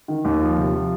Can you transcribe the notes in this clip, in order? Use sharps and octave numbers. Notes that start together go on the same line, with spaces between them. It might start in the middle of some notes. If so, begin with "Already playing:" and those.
D#3
D#2
F3
C3
F3